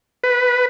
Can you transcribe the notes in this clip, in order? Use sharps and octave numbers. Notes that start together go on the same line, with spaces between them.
B4